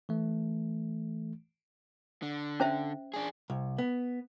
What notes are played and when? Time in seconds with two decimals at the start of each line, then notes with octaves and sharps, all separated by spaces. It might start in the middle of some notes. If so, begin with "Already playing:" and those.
0.09 E3 A3
2.22 D3
2.60 C#4 C5 E5
3.14 D4 G#4
3.50 C2
3.78 B3